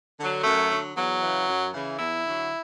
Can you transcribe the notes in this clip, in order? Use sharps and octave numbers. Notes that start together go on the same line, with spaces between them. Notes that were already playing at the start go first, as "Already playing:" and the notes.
D3 F#3
F#2 A3
D3 F#3
E2 F#3
C#3 E3
F#2
C#3 E3
E2 E4
D3 F#3